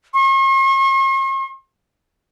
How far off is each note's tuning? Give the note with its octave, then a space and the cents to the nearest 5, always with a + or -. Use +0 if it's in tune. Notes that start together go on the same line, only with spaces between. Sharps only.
C#6 -45